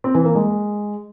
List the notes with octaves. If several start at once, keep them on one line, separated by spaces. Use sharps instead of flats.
C4
E3
A#3
G#3